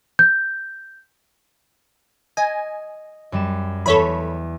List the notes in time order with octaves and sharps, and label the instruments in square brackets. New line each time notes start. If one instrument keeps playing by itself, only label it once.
[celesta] G6
[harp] D#5 [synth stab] G#5
[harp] F#2 G3 E7
[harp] E2 [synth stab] A4 C#5 B5